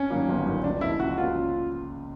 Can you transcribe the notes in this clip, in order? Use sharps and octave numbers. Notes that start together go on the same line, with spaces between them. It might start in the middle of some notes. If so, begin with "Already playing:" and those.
Already playing: C#4
G2 D#3 F#3 A#3
G1
G2 D#3 F#3 A#3
C#2 D4
C#3 F3 A#3 C#4 E4
C#2 F#4
C#3 F3 A#3 C#4 F4